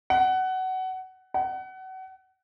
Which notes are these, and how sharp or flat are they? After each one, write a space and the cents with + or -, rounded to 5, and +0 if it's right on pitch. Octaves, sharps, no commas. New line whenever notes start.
F#5 +20
F#5 +30